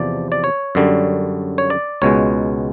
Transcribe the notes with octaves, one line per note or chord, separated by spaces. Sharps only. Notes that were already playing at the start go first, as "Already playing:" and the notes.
Already playing: E2 C3 F3 D5
D5
C#5
F#2 D3 G3
C#5
D5
C#2 B2 G#3 C#5